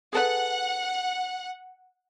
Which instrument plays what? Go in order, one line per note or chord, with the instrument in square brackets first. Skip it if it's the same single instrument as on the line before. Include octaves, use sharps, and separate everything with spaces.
[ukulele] G#4 A4 B4 [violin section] F#5